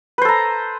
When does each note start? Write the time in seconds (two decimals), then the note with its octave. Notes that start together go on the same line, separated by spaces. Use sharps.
0.18 B4
0.22 C5
0.25 A4
0.29 A#5